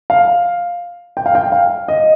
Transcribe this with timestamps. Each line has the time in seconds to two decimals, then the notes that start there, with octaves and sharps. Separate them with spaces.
0.10 F5
1.17 G5
1.26 F5
1.35 G5
1.52 F5
1.88 D#5